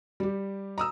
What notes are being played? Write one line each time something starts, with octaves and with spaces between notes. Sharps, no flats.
G3 G4
A#5 D#6 E6